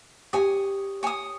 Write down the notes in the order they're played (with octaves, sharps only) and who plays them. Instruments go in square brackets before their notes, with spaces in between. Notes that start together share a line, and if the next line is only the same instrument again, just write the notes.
[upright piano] G4 [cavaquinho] C#5 G#5 D#6
[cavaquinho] C#5 G#5 D#6